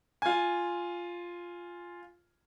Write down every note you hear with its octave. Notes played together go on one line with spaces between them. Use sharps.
F4 G#5